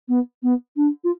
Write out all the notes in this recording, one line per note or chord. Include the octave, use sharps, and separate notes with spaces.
B3
B3
D4
F4